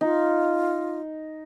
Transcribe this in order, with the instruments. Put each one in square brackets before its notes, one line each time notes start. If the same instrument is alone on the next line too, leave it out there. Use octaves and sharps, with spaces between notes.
[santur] D#4 [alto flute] F4